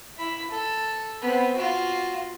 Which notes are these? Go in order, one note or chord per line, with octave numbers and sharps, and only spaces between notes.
E4 B5
A4
B3 C4
F4 F#4